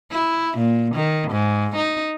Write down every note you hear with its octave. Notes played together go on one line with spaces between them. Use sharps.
E4
A#2
D#3
G#2
D#4